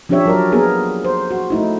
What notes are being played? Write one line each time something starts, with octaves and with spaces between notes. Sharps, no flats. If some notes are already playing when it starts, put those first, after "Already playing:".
F3 C#4 D4 G4 C#5 E5
F#3 A#4 D5
A#3 B3 G#4 A#4
C5
F#4
A3 D#4 E4